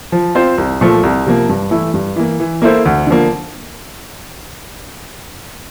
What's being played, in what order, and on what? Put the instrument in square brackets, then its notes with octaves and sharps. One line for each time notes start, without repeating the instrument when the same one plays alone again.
[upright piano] F3
C4 F4 C5
C2
A#2 F3 A3
C2
C3 F3 A#3
G2
E3 A3 E4
G2
E3 A#3
E3
A#3 E4 A4 C5
D2
D3 F3 A#3